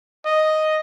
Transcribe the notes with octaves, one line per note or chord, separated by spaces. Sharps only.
D#5